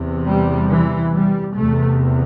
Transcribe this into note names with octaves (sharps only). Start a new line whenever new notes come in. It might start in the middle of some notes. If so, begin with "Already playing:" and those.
Already playing: E2 C3
G3
E3
G3
E2 C3 A3